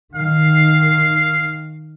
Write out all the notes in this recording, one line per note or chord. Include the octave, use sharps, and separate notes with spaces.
D#3 F5